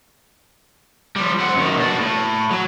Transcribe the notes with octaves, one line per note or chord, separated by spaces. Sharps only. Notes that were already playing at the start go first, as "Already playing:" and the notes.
F3 G3
C4 F#5
F#2 D#3
B2 D4
A2
F#3